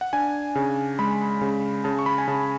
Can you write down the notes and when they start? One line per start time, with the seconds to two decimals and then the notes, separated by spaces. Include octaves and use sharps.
0.01 F#5
0.13 D4 G#5
0.55 C#3
0.99 G#3 B5
1.41 C#3
1.84 C#3 A5
1.99 C#6
2.06 B5
2.18 G#5
2.28 C#3 A5